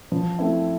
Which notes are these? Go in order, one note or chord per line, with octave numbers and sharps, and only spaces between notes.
F3
A3 C4 E4